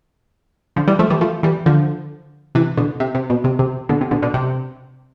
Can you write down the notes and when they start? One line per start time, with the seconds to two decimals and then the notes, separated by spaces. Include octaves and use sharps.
0.76 D3 F3
0.88 E3 G3
0.99 F3 A3
1.10 E3 G3
1.21 F3 A3
1.43 E3 G3
1.66 D3 F3
2.55 C3 E3
2.77 B2 D3
3.00 C3
3.15 C3
3.30 B2
3.44 C3
3.59 C3
3.89 B2 D3
4.01 C3
4.11 B2 D3
4.22 B2 D3
4.34 C3